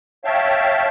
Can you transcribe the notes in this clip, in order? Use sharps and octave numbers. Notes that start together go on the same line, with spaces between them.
C#5 E5 F5 G5 A5